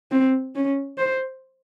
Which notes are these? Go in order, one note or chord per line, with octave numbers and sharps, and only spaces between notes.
C4
C#4
C5